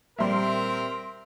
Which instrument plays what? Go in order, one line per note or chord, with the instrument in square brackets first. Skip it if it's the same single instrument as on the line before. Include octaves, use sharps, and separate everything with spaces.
[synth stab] A#1 G3 [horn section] C4 A#4 [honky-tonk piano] E5 C6